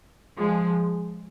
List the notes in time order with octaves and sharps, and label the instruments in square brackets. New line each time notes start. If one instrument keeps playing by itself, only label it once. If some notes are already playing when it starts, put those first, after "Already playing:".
[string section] F3 G#3